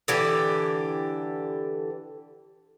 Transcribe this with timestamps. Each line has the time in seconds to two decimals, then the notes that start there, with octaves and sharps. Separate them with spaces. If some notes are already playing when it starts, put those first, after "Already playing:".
0.08 D3 E3 G4